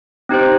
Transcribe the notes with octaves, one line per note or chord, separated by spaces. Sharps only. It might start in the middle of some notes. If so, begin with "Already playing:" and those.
C4 D#4 G4 C5